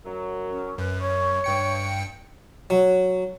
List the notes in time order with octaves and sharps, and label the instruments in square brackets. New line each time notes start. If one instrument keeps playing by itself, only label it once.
[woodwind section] F#2 F#3
[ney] C#4
[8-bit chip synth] F#2 [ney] B4
[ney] C#5 [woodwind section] C#6
[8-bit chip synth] G2 G5 C#7
[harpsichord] F#3